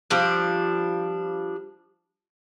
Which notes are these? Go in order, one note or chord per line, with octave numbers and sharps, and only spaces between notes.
F3 G3 D4